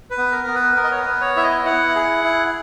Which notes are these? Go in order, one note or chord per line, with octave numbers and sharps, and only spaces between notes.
B4
B3
A#4
B3
B4
B3 A#4
D#5
C#5
B4
B3
C#5
E4 E5
D#5
E4 F#5
G#4
E4